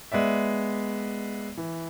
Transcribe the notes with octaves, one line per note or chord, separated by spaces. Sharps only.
G#3 B3 D5 E5
E3